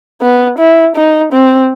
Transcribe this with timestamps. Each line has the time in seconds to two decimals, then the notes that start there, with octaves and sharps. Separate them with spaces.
0.22 B3
0.58 E4
0.96 D#4
1.33 C4